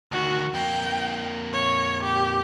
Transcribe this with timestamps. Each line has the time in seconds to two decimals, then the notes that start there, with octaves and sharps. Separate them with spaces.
0.12 D2 D#3 F#4
0.54 F2 A#3 G5
1.53 C#5
2.03 G4